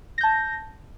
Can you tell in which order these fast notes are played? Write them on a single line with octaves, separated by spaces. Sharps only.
A#6 G6 A5